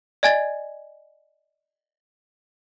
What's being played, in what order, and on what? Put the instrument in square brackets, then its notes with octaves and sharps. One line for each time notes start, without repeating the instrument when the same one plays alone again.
[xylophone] D5 D#5 G#5 G#6 A6